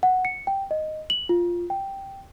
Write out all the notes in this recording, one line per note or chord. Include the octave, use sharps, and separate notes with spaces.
F#5
C#7
G5
D#5
F#7
F4
G5